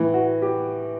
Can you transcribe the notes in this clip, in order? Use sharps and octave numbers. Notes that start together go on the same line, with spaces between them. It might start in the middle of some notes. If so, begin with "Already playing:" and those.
Already playing: A2 E3
F#4
G4